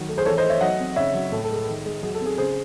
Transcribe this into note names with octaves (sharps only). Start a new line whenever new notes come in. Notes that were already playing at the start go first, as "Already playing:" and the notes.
Already playing: D#3 F#3
A3
G#4 C5
E3 A4 C#5
C5 D#5
A3
C#5 E5
F#3 D#5 F#5
C4
C#3 C#5 E5
F#3
A2 A4
A4
G#3
A4
D#3
G#3
F#3 G#4
A4
C4
G#4
C#3 G#4 C5